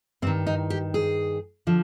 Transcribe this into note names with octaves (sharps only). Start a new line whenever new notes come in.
G2 D#3 C4
D#4
G4
G#4
D3 F3